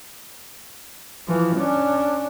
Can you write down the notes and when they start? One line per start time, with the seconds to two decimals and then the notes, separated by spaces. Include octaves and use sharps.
1.28 E3 F3
1.57 C#4 D4